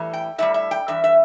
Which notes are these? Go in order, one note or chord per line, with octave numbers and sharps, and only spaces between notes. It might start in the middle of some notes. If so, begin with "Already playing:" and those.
Already playing: A2 E3 G3
G5
A2 E3 G3 E5
E5
G5
G2 E3 E5
E5